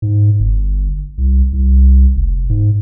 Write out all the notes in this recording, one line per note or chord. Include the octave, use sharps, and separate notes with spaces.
G#2
G1
C2
C2
F1
G#2